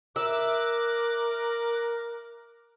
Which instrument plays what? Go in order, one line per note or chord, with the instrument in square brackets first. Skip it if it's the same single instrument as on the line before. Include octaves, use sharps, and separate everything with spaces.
[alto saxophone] A#4 [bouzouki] E5 [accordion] D6 F#6